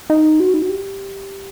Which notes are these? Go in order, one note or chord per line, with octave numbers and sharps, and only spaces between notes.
D#4
F#4
D#4
F#4
G4